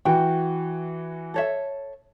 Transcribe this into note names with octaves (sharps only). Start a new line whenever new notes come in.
E3 F#4 G5
A4 C#5 E5